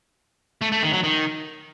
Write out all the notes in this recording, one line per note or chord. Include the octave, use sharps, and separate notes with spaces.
A3
A3
D#3
F#3
D#3